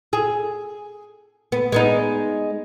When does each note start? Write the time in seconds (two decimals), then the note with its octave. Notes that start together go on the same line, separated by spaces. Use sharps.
0.13 G#4
1.52 B3
1.72 G#3 B3 D#4